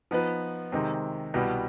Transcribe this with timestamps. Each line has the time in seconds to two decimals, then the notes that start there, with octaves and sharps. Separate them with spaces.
0.11 F3 B3 D#4 B4
0.72 C3 D#3 G#3 C4
1.34 C2 B2 G3 B3